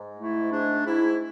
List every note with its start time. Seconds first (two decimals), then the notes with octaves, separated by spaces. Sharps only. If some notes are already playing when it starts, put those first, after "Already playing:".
Already playing: G#2
0.17 A3 E4
0.51 G#2 D4
0.85 G#2 E4